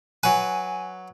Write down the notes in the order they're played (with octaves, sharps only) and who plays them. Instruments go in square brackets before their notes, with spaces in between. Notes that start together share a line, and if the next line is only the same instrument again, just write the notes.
[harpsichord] F#3 B4 [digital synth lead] G#5